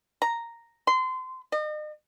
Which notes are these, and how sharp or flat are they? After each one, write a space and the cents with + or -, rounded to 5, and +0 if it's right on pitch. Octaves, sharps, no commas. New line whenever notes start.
A#5 -5
C6 -25
D#5 -40